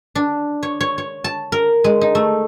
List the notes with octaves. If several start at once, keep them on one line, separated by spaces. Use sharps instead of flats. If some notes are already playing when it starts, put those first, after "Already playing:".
D4
C#5
C#5
C#5
A5
A#4
G#3
D#4
A3